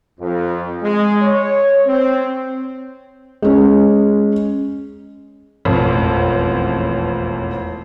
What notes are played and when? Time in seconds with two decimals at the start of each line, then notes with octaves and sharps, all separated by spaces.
0.20 F2
0.82 G#3
1.22 C#5
1.86 C4
3.42 G#3 C#4
5.65 E1 A1 F2